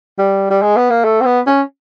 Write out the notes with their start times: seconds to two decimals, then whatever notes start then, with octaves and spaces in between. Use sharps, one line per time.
0.18 G3
0.50 G3
0.62 G#3
0.77 B3
0.90 A#3
1.04 A3
1.21 C4
1.25 B3
1.47 C#4